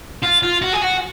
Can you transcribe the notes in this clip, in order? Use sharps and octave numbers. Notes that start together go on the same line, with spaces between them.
F4
F4
F#4
G#4
F#4